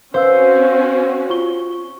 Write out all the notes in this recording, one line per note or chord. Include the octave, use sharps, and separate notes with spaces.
C4 C#4 F#4 B4 C5 F5 E6
F4 C#6 G7